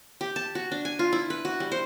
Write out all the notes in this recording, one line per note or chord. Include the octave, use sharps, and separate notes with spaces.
G4
A5
F#4
D4
G#5
F4
E4
B4
F#4
G3
C5